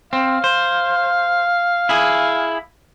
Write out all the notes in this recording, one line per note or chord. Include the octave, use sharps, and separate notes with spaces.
C4 F5
C5
E4 G#4